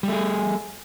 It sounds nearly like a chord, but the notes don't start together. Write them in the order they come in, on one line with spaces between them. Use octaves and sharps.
G3 A3 G#4